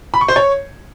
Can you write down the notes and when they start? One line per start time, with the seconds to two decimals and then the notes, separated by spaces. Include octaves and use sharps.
0.14 B5
0.21 C#6
0.28 C5
0.36 C#5